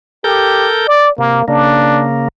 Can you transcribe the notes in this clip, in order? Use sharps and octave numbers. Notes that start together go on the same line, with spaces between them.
G4 A4 A#4 G6
D5
C3 A#3
C#3 A#3 D4